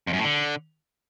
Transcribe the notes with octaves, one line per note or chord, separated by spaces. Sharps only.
F2
F#2
A2
D3